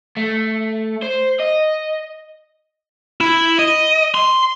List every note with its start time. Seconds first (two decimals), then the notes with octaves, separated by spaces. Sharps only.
0.17 A3
1.03 C5
1.40 D#5
3.21 E4
3.59 D#5
4.14 C6